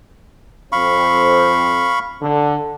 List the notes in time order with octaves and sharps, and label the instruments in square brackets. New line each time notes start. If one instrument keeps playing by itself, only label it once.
[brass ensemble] F2 C4 [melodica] F5 B5 C#6
[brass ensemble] D3